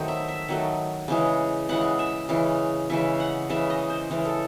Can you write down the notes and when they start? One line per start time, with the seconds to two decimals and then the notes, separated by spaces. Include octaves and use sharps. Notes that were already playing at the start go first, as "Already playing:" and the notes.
Already playing: D#3 F#3 A3 C5
0.08 E5
0.28 E5
0.49 D#3 F#3 A3
1.08 C#3 E3 G#3
1.69 C#3 E3 G#3 F#5
1.99 E5
2.29 C#3 E3 G#3
2.90 C#3 E3 G#3 E5
3.20 F#5
3.50 C#3 E3 G#3 E5
3.70 D#5
3.90 C5
4.10 C#3 E3 G#3
4.25 A4